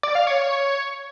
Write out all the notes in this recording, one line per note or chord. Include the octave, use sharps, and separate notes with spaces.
D5
F5
C#5